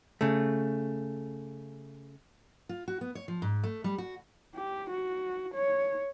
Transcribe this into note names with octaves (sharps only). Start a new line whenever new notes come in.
C#3 A3
F4
F#4
B3
C#5
F3
G#2
A3
G3
F#4
G4
F#4
C#5